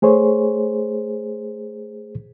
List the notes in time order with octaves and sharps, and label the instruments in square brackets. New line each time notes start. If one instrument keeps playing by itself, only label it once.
[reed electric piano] A3 G#4 C5 C#5